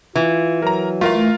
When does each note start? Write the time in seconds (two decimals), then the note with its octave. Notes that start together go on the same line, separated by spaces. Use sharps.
0.16 E3 F4
0.62 F#3 A#4 A#5
1.01 A3 F4 A#4 F5